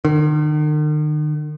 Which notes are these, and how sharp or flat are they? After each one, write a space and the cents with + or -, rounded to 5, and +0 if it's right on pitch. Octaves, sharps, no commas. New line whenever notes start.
D#3 -45